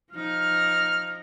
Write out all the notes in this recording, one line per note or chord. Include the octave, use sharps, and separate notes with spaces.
F3 D#4 F6